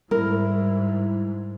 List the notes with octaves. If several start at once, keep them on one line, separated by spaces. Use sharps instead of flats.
G#2 G3 E4 A#4